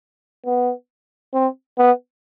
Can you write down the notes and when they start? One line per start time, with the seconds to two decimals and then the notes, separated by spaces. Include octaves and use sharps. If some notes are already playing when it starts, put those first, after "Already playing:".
0.46 B3
1.34 C4
1.78 B3